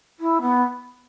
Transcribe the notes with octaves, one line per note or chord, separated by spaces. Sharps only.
E4
B3